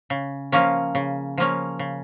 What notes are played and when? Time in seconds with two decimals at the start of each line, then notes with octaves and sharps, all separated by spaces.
0.10 C#3
0.52 F3 A#3 C#4
0.95 C#3
1.38 F3 A#3 C#4
1.79 C#3